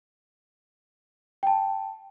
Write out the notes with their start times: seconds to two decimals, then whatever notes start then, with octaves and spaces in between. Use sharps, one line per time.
1.43 G5 A5